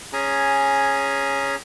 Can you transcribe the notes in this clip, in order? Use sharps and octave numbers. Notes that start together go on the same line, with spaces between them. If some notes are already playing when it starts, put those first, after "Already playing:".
C#4 G#4 G#5 A#5